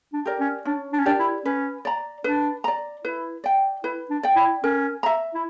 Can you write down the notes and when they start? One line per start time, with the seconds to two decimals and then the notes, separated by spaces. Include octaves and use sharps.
0.13 D4
0.25 G4 A#4 D5
0.40 C#4
0.65 C#4 D4
0.93 D4
0.99 C#4
1.06 D4 G4 A#4 D5
1.19 E4
1.45 C#4 B4
1.85 D5 A#5
2.24 D4 B4
2.64 D5 A#5
3.05 E4 B4
3.44 D5 G5
3.84 E4 B4
4.10 D4
4.23 D5 G5
4.36 E4
4.63 C#4 A#4
5.03 E5 A#5
5.34 E4